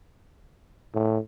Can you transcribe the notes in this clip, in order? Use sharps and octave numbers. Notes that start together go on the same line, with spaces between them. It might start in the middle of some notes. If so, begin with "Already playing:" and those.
A2